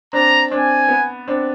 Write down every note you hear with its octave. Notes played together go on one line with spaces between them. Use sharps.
C4 D4 A#5
C4 D4 G#5
B3
C4 D4